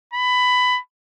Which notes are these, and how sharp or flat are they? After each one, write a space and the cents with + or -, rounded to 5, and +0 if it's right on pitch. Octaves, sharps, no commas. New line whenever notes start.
B5 +15